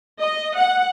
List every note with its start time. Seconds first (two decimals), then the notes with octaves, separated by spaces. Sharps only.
0.20 D#5
0.56 F#5